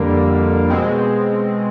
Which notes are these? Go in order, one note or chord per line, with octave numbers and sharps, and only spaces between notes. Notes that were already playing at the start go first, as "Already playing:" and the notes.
Already playing: F2 D3 G3 A#3
B2 G#3 C4